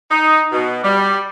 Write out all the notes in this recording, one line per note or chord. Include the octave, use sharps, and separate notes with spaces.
D#4
B2
G3